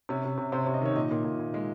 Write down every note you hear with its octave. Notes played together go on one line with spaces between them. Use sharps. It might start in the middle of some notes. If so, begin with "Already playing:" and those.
C3 C#4
C3
C3
C3 C5
C#5
C3
D#5
D#3 C#5
A#2 D#5
A#2
A#2
A#2
G#3